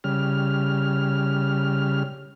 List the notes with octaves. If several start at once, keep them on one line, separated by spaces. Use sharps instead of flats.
C#3 G3 F6